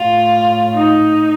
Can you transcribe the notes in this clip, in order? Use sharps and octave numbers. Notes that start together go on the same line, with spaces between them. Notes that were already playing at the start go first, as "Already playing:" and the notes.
Already playing: A2 F4
D#4